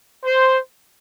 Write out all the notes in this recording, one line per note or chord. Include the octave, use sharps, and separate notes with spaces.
C5